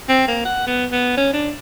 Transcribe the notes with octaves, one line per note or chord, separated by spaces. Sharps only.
C4
A#3
F#5
B3
B3
C#4
D4